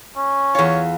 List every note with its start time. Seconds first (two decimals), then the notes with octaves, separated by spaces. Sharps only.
0.17 C#4
0.55 E2 F4 C#5